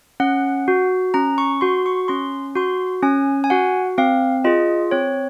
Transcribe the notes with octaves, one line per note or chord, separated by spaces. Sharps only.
C#4 F#5
F#4
C#4 A#5
C#6
F#4 C6
C#6
C#4 C6
F#4 C6
C#4 G#5
G#5
F#4 F#5
C4 F5
F4 G#4 D#5
C4 C#5